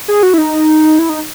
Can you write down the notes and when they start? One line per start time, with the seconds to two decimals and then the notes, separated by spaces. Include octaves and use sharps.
0.08 G#4
0.23 F#4
0.34 E4
0.38 D#4
0.99 E4
1.09 D#4